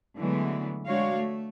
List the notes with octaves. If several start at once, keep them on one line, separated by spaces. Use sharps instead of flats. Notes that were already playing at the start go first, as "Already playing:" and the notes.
D3 E3 F#3 G#3 A3 B3
G#3 D4 F#4 C#5 F5
A3